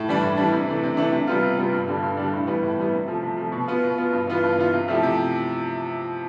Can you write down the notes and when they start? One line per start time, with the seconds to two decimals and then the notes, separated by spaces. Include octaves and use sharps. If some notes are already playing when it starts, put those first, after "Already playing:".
Already playing: A2
0.08 E3 G3 D4
0.23 A2
0.37 E3 G3 D4
0.53 C3
0.68 E3 A3 D4
0.83 C3
0.97 E3 A3 D4
1.12 C3
1.27 G3 B3 F4
1.42 C3
1.58 G3 B3 F4
1.73 G2
1.88 D3 G3 D4
2.03 G2
2.17 D3 G3 D4
2.33 A2
2.47 E3 G3 B3
2.63 A2
2.78 E3 G3 B3
2.93 C3
3.08 F3 A3
3.23 C3
3.37 F3 A3
3.52 B2
3.68 B3 F4
3.83 B2
3.98 B3 F4
4.12 G2
4.27 E3 B3 F4
4.43 G2
4.58 E3 B3 F4
4.73 C3
4.88 F3 A3 E4 G4
5.03 C3